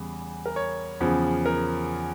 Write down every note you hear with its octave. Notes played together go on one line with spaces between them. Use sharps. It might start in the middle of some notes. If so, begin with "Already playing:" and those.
Already playing: E2 C#3 G3
A#4
C#5
E2 C#3 F3
A#4